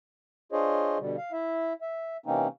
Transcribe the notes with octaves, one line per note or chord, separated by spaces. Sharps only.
D4 F4 G#4 C5 C#5 D#5
B2 D3 G3
F5
E4 E5
E5
C3 E3 A#3 C4 C#4 D#4